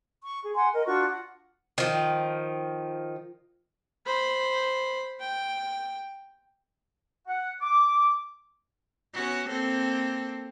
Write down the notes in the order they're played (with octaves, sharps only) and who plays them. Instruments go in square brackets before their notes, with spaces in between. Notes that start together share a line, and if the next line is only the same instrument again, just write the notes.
[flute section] C#6
G#4
F#5 G#5 C6
A#4 D#5
D4 F4 F#4 C#6
F#5
[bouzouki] D#3 F3
[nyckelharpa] C5 B5
G5
[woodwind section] F#5
D6
[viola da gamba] B3 C#4 F#4
A#3 C4 A4